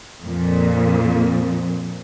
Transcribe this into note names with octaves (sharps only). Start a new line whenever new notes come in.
F2 A#2